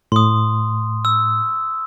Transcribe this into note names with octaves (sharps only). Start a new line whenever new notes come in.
A2 C6 D#6
E6